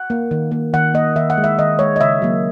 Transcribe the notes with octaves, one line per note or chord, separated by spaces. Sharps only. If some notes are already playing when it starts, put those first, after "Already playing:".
Already playing: F#5
A#3
D#3
A#3
D#3 F#5
A#3 D#5
D#3 E5
F#5
G#3
E5
D#3 D#5
G#3 C#5
D#5
C#3 E5
F#3 A#3